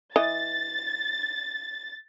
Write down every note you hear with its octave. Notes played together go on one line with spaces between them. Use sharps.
E3 D#5 A6